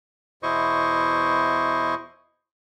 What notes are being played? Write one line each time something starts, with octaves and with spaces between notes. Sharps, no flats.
E2 B2 E4 C5 D#5 C#6